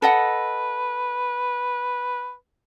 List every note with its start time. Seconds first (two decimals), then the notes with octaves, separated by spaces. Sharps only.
0.02 A4 B4 D#5 F#5